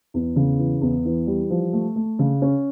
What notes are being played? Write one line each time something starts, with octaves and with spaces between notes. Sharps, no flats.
E2
C#3
E3
E2
E3
G3
F3
A3
A3
C#3
C#4